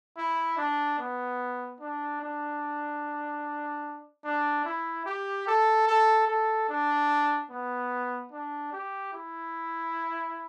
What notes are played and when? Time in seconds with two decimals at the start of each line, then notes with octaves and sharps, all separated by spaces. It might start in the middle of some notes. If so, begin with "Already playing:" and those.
0.17 E4
0.58 D4
0.99 B3
1.80 D4
2.21 D4
4.25 D4
4.65 E4
5.06 G4
5.47 A4
5.87 A4
6.28 A4
6.69 D4
7.51 B3
8.32 D4
8.73 G4
9.13 E4